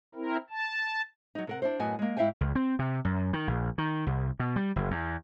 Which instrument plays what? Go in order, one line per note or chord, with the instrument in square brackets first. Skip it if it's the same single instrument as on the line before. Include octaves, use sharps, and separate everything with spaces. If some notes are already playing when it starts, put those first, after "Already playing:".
[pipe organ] C4 E4 A#4
A5
[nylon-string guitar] F#3 D#4
C3 A#4 F#5
D4 E4 C5
F#2 A2 B3 F#4 D#5 G#5
G#3 A#3
G#2 E4 E5 F5 G5 G#5
[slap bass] C#2
C4
C3
F#2
D#3
A#1
D#3
C2
B2
G3
F#1
E2